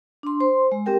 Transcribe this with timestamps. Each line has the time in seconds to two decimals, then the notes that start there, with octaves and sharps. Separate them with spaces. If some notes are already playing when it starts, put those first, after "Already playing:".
0.23 D4 C6
0.40 C5 C6
0.72 G#3
0.86 C4 G4 A#4 G5